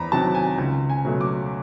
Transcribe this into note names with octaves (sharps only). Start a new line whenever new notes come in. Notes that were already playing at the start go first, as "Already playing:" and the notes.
Already playing: E2 A#5 B5
C3 D#3 F#3 A5
G#5
C#2
G#5
B2 F#3 A3
D6